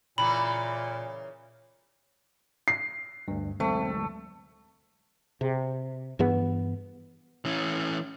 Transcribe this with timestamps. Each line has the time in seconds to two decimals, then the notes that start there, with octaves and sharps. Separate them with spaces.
0.18 A#2 C#3 E3 A#3 B5
2.68 C7
3.28 D2 G2
3.60 D2 F#3 G#3 A3 C4
5.41 C3
6.19 G2 E3 B3
7.45 E3 C#4